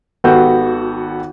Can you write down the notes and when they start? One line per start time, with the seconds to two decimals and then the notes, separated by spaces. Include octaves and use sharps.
0.24 G#1 B3 F#4 G4 A4 G6